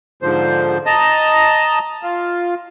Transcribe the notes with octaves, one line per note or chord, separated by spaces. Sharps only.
G#2 D3 F3 C5
D#5 A5 A#5
F4